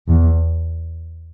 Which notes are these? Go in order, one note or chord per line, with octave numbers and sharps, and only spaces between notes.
E2